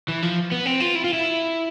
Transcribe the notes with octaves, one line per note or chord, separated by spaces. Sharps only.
E3
F3
B3
C4
F4
E4
F4
E4